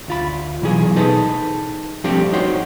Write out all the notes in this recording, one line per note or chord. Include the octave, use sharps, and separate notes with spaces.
D2 F4 B5
B1 E3 G#4
D#4 G#4 A4 B4 C5
F3 G3 A3 C4 D4 G4
D#4 F#4 C5 C#5